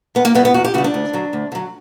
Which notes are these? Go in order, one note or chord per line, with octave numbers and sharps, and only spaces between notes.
E2 B3
A#3
C#3 E3 G3 B3
B3
E2 F#4
G4
C#3 E3 G3 F#4
D4
D2
D3 F#3
D2
D3 F#3